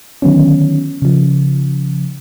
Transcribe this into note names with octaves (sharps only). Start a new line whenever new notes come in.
D3 D#3 F#3 B3 C#4
C#3 F3